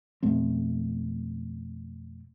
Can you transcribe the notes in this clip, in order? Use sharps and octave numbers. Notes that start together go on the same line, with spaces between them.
F2 B2 A3 C4